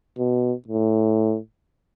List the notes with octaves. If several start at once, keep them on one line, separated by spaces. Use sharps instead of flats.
B2
A2